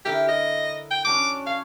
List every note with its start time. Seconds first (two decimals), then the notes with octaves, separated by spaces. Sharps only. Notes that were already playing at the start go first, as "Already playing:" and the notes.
0.05 D3 E4 G4 A#4
0.29 D#5
0.91 G5
1.05 C#4 D4 F#4 D6
1.46 C#5 F5